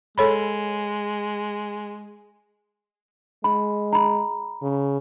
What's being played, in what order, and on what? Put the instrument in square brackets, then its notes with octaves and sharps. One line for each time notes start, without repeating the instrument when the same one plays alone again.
[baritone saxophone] G#3 [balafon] A4 C#5 B5
[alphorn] G#3 [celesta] B5
[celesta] A#5 B5
[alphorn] C#3